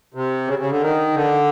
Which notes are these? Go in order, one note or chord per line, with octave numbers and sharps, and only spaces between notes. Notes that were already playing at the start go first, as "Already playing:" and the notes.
C3
C#3
C#3
D3
D#3
D3